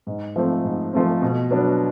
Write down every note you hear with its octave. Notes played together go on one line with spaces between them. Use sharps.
G#2
F3 A3 C4
G#2
F3 A3 C4
B2
F#3 B3 D4